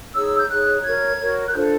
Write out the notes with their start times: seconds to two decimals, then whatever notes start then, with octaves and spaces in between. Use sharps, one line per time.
0.14 D#4 G#4 C#5 E6
0.38 G6
0.49 D#4 G#4 C#5 F#6
0.84 F#4 A#4 C#5 G#6
1.19 F#4 A#4 C#5
1.48 F#6
1.54 D4 F4 A4 C5 G6